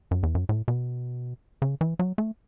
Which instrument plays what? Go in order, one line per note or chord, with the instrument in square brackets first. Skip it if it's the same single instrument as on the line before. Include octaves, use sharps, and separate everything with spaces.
[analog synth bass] F#2
E2
F#2
A2
B2
C#3
E3
F#3
A3